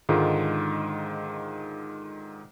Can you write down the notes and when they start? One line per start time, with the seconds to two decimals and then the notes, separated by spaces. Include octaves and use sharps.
0.09 G#2 D3 D#3 G#3 F4